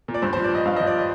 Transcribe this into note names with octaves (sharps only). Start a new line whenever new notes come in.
A#2
D5
G2 C5
C5
F3
D5
F3 D#5
G2 F5
D#5
F3
D5
D#5